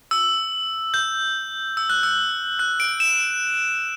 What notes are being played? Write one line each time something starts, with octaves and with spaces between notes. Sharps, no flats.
E6
G6
E6
F#6
E6
F#6
D7
E7